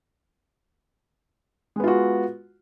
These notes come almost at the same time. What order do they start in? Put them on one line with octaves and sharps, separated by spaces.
G#3 B3 F4 F#4